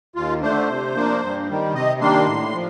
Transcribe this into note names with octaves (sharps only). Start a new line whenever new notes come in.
D#2 F4
D3 A3 D4 C5
C3
F3 A#3 D4
G2
D#3 G3
C3 D#5
D#3 G3 A#3 D4 C6
A2
F3